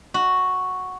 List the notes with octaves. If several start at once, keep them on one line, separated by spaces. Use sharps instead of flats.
F#4